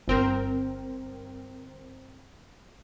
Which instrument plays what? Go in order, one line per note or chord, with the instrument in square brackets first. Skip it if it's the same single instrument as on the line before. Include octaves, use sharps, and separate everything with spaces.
[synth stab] G1 C4 A#4